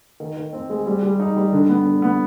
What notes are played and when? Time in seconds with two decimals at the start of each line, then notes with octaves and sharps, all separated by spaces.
0.20 D#3
0.37 D#3
0.53 C4
0.70 G#3
0.86 G3
1.03 G3
1.20 D#4
1.36 G3
1.53 D3
1.69 B3
1.85 D3
2.02 B3